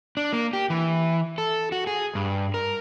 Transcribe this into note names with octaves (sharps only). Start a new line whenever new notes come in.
D4
A#3
G4
E3
A4
F#4
G#4
G2
A#4